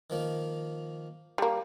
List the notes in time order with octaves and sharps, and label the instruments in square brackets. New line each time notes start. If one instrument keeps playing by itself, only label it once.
[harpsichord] D#3 F3 A#3
[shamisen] G3 A#3